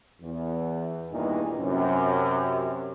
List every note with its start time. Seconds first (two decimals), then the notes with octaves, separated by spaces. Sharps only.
0.22 E2
1.12 E2 G2 A#2 D#3 E3 D#4
1.59 F#2 C3